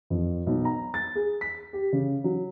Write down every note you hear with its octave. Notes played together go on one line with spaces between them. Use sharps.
F2
B1
A#5
A6
G#4
B6
G4
C#3
F#3